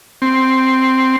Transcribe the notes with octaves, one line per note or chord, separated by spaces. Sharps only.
C4